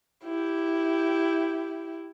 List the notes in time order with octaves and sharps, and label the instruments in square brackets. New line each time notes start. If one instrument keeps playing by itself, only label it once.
[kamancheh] E4 G4